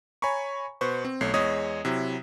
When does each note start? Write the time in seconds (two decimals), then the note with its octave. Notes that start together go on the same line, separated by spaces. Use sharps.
0.22 C#5 G#5 A#5 B5 C#6
0.81 B2 B4 C5 C#6
1.05 C4
1.21 B1 A3 C#5 C7
1.34 E2 G#3 C#5 D#5 D#6
1.85 C3 F#3 E4